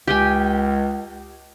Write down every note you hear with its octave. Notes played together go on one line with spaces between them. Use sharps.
C#2 G4 G5 G#5